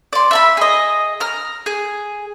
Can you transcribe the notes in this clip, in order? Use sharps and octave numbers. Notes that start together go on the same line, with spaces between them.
D5 C6
E5 A5 B5
G#4 D#5
A#5 F6
G#4